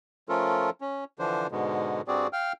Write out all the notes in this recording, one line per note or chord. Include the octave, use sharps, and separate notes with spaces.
F3 A3 C#4 F4 A4 A#4
C#4
D3 E3 F3 D4 C5
G#2 B2 D3 G#3 B3
G2 G3 C4 F#4 G#4 D5
F5 G5 F6